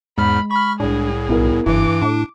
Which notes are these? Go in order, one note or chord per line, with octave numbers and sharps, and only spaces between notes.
E2 G#2 G#3 B5 F6
B5 C#6 F6
C2 A2 D4 G#4
B1 B3 E4 A#4
F#1 G2 E3 E4 D6
A2 D4